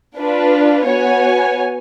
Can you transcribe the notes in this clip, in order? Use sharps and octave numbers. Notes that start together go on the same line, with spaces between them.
D4 F4 B4
B3 F#4 C#5 G#5